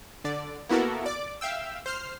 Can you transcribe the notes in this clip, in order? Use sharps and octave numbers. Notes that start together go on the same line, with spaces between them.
D3 D5
A#3 B3 E4 F#4 A4 A#4
D5 D6
E5 F5 G5 E6
C5 F6 C7